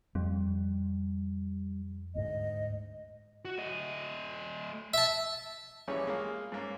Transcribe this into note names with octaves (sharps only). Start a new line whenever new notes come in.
F2 G3
D2 G#2 D#5
F#4
A3 D#5
E5 A5
A#1 E3 G3 C#4 G#4 C#5
G#3 A#3 F4 F5
G#2 A#3 C#4